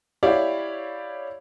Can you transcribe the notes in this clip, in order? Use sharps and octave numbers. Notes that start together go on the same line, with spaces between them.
E4 G4 C#5 D5 F5